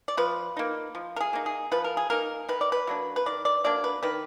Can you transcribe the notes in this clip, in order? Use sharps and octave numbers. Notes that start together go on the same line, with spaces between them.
D5
F3 B4
A#3 D#4
F3
A#4
G#4
A#3 D#4
G#4
F3 B4
A#4
G#4
A#3 D#4 A#4
D#3 B4
D5
B4
F#3 A#3 D4
B4
D#3 D5
D5
F#3 A#3 D4 D5
B4
D#3 B4